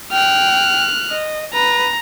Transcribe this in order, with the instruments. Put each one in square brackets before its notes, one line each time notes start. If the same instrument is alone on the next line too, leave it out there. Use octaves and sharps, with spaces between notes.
[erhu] G5 [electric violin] F6 F#6
[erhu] D#5
[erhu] B4 [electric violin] A#5